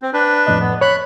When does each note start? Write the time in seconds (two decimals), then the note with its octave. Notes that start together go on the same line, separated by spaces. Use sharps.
0.02 C4
0.13 D4 B4
0.47 F2 A2 D#5
0.61 B3
0.81 C#5 B5 F#6